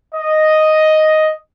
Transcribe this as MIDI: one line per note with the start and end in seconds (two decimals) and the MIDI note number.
0.15 1.33 75